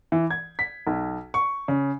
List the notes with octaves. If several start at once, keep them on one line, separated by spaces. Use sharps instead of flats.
E3
G#6
B6
B1
C#6
C#3